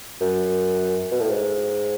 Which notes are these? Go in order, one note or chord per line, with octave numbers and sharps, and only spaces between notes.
F#2
B2
A2
G#2